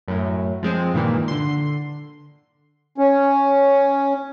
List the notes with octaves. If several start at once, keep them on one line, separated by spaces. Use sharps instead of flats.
F#2 A2
F3 G#3 C4
G2 A#2 D#3 E3
D3 C6
C#4